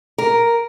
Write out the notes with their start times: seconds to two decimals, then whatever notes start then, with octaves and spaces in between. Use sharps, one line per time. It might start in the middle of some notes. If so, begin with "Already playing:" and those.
0.18 A#4